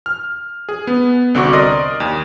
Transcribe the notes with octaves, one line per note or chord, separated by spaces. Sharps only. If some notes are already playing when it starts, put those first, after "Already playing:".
F6
G#4
B3
C2 D3 C4 F#4 C#6 D6
A#4 D5 D#5 C6 D#6
D#2